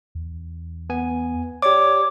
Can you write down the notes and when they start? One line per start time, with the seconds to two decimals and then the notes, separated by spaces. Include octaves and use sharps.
0.15 E2
0.90 B3 G#5
1.62 G4 C#5 D5 D6